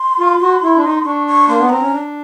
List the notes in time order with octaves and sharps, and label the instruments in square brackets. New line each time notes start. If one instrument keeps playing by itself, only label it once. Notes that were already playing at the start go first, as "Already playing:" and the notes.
Already playing: [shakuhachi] C6
[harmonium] F4
F#4
E4
D4
D#4
[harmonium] D4 [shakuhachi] C#6
[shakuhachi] C#6
[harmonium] A#3 [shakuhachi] C6
[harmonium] B3
[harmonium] C4 [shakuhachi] A#5
[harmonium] C#4
D4